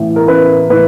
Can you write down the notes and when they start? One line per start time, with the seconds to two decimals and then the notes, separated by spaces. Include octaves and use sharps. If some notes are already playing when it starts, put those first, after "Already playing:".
Already playing: A1 A2 E3
0.16 A#4
0.28 A1 B4
0.69 A2 E3 B4